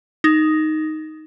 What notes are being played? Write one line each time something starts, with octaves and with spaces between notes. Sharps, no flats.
D#4